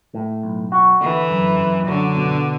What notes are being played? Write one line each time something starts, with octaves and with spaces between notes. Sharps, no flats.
A2
B1
F#4
D3 E3
F#2
F#2
D3 F#3
B2